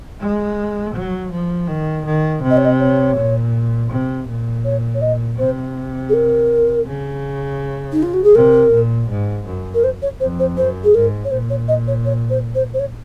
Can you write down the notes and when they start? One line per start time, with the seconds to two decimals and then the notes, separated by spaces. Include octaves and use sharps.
0.20 G#3
0.95 F#3
1.32 F3
1.68 D#3
2.05 D#3
2.43 C3
2.50 D#5
2.57 C#5
2.65 D#5
2.79 C#5
3.16 A#2
3.90 C3
4.27 A#2
4.64 C#5
4.94 C#5
5.01 D#5
5.38 C3 C5
6.09 G#4
6.13 A#4
6.87 C#3
7.92 D#4
8.02 F4
8.14 F#4
8.24 G#4
8.35 C3 A#4
8.71 A#2
9.09 G#2
9.46 F#2
9.74 A#4
9.84 C5
10.02 C#5
10.20 F2 C5
10.39 C5
10.57 F#2 C5
10.84 G#4
10.94 G#2 A#4
11.24 C#5
11.31 A#2 C5
11.50 C#5
11.68 D#5
11.87 C#5
12.05 C#5
12.30 C5
12.55 C5
12.74 C5
12.79 C#5